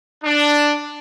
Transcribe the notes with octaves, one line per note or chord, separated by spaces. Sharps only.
D4